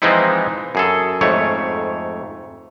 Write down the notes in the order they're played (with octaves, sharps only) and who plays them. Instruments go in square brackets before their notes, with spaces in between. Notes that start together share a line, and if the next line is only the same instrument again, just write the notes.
[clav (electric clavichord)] E3 F3 G#3 C4 D#4 E4
F#2 G#4 A4
F2 G#2 A3 C#5